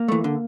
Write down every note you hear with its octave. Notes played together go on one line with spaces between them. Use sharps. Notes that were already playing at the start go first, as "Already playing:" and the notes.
Already playing: A#3
E3 A3
D3